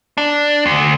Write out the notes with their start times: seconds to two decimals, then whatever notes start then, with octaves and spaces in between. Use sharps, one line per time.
0.18 D4
0.66 D2